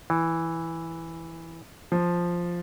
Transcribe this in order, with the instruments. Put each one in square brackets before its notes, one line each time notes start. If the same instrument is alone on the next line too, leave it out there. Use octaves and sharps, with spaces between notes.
[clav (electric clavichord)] E3
[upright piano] F3